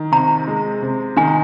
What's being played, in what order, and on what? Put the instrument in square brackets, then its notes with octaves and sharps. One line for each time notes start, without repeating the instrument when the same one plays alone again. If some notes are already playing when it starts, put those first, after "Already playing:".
Already playing: [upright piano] D#3
[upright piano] C3 [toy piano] A#5
[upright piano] G#3
C3
[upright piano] D#3 [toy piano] G#5
[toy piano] A#5